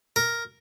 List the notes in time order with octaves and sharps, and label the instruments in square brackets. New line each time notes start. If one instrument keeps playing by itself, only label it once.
[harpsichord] A#4